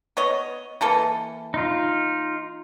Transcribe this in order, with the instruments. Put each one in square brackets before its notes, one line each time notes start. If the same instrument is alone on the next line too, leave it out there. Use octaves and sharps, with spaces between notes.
[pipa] B3 C#5 D#5
E3 A#3 A4
[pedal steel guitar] D#4 F4